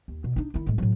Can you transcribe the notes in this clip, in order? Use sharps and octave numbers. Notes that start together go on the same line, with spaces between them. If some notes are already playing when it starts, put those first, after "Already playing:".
D#2
B2
D4 D#4
D#3 E4
A2 G#3
A2 F#3